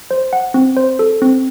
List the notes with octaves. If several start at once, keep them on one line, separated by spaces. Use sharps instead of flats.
C5
F#5
C4
C5
A4
C4